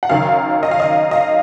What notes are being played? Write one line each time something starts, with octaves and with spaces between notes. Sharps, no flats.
F#5
F#1 F#2 D#3 F5
D#5
F5
D#5
D#5
F5